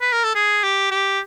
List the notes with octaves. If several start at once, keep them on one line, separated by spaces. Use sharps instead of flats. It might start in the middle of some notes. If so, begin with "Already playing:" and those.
B4
A#4
A4
G#4
G4
G4